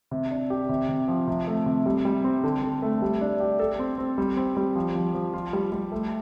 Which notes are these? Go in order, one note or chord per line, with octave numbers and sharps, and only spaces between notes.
C3
D4
G4
C3
C3
F3
C3
A3
C3
G3
G3
C4
D3
D3
A3
G3
D4
G4
A4
C4
C4
G3
C4
G3
F3
F3
F3
F4
G3
G3
A3